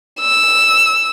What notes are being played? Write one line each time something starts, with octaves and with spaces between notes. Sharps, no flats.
E6